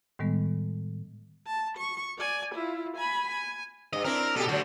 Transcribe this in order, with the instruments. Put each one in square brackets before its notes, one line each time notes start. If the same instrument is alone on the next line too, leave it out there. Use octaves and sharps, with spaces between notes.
[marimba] A2 D#3 G3 G#3 B3
[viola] A5
C#6
D5 G#5
E4 F4
G#5 B5
G#5
[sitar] G2 [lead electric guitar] D#5
[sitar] C4 D4 E4 [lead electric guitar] A#4
[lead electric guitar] B2 [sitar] G4 A4
[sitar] D3 F#3 A3 [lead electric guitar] F#4 C5